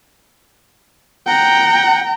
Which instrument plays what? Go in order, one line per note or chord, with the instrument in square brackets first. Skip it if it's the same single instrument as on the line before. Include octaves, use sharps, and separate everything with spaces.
[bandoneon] F#5 [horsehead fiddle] G5 A#5